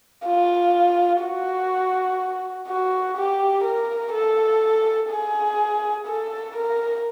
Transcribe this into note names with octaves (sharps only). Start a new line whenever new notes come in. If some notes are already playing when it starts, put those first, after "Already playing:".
F4
F#4
F#4
G4
A#4
A4
G#4
A4
A#4